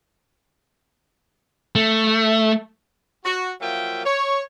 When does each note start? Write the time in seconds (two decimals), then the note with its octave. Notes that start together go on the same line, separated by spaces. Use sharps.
1.75 A3
3.24 F#4
3.61 F3 F#3 A#3 F4 E5 G5
4.05 C#5